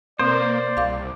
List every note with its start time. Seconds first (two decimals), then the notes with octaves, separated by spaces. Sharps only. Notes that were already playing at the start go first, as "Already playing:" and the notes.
0.19 B2 A#3 C4 C5 D5
0.77 C2 F5 D6